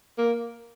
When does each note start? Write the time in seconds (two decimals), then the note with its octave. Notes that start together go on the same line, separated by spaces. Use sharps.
0.18 A#3